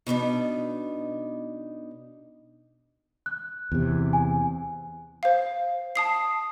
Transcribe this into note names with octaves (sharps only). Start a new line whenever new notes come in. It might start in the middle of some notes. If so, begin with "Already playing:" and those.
B2 B3 D4 D#4
F#6
E2 C3
G#5
C5 F5
A5 D#6 C7